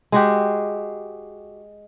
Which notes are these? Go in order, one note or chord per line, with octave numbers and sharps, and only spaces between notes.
G#3 F#4 G4